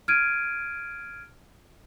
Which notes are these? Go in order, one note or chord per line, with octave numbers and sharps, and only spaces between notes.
F6 G#6 D7 D#7